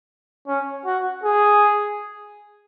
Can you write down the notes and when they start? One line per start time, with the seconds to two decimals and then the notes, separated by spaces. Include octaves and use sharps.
0.47 C#4
0.85 F#4
1.24 G#4